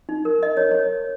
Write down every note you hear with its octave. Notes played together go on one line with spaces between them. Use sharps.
D#4
A#4
D#5
C#5
C#5